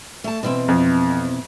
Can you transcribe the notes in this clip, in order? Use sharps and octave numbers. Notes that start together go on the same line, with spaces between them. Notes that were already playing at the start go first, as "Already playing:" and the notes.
A3 A5
B2 E3 C4
F2